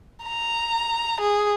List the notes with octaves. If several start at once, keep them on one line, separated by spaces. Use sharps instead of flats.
A#5
G#4